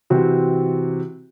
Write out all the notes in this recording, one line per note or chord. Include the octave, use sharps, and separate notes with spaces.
C3 E3 C4 F#4